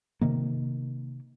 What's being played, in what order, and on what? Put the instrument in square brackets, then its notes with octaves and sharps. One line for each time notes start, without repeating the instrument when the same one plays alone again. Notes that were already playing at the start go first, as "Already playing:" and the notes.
[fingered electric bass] C3 D#3 A#3